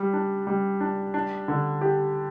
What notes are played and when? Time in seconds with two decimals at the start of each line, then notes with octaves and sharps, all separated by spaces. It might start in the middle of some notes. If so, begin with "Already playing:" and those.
Already playing: G3
0.13 D4
0.47 G3
0.81 D4
1.14 D4
1.48 D3
1.81 G4